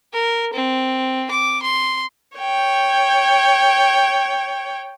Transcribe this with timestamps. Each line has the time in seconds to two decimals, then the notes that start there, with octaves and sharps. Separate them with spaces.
0.13 A#4
0.53 C4
1.31 D6
1.62 C6
2.38 C#5 G5